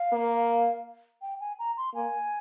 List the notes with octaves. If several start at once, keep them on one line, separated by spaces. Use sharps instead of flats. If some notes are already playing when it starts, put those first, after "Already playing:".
Already playing: F5
A#3
G5
G#5
A#5
C6
A#3 G#5